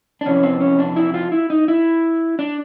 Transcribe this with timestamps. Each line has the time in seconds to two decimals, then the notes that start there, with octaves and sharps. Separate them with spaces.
0.21 D4
0.26 F2 C3 E3 C#4
0.43 C4
0.61 C#4
0.79 D4
0.96 E4
1.14 F4
1.32 E4
1.50 D#4
1.68 E4
2.39 D4